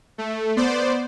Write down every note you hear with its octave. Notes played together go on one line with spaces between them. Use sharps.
A3
B3 C5 D5